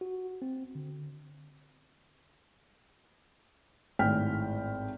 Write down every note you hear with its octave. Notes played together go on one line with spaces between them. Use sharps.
F#4
C4
D3
G#1 A2 G5 F6 B6